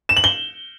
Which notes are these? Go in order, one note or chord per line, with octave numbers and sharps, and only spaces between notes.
E7
F#7
G7